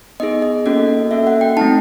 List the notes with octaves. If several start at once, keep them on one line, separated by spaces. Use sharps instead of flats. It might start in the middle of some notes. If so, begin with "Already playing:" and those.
B3 D#4 G#4 D#5
D#5
A#3 C#4 F#4 A4 D#5
A#3 C#4 F#4 A4 E5
F#5
G5
A3 C4 D#4 A5